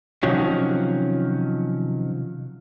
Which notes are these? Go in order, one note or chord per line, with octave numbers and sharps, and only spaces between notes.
C3 D#3 F3 F#3 C#4